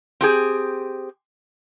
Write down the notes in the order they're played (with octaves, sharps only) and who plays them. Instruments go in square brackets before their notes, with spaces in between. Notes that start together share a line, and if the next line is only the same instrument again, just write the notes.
[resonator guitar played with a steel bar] C4 G4 G#4